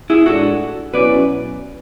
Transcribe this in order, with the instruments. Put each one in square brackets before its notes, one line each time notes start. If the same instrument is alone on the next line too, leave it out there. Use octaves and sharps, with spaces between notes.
[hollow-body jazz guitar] E4 G#4
[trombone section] A2 G#3 D4 [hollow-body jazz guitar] F#4 A4
[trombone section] B2 F#3 C#4 E4 [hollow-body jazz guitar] B4 D5